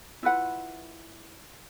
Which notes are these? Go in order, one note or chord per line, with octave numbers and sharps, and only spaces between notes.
E4 F4 B4 F#5